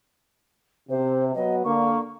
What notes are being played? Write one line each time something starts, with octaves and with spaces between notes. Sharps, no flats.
C3 C5
F#3 B3 D#5
D3 A#3 C#6